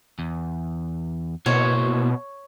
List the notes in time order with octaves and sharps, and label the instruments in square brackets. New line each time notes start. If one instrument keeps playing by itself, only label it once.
[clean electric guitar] E2
[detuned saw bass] B2 [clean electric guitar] A#3 E4 C5 [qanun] C#5